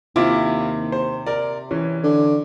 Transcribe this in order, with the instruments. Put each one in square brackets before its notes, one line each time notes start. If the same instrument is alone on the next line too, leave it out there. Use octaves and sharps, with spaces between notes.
[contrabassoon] D#2 [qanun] C3 [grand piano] E4 F4 D6
[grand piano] C5
A#4 D5
E3 C#4
[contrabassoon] D3